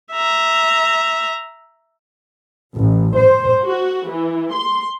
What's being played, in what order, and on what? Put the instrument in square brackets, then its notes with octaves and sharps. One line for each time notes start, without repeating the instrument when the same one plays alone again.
[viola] E5 A#5
[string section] A1
C5
F#4
E3
C6